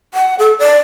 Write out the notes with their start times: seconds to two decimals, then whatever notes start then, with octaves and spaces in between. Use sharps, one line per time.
0.14 F#5
0.39 A4
0.59 D5